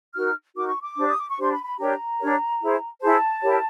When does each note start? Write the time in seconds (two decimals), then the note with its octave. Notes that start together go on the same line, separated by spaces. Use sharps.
0.15 D#4 F#4 A#4 F6
0.56 D#4 F#4 A#4 D6
0.68 C#6
0.82 D6
0.96 D4 G4 C5
1.08 D#6
1.18 D6
1.29 C#6
1.38 D4 G4 C5 C6
1.51 B5
1.65 B5
1.78 D4 G4 A#4 C#5 A#5
2.20 D4 G4 A#4 C#5
2.60 E4 G#4 C5
3.01 E4 G#4 C5 A5
3.43 E4 G4 A#4 C#5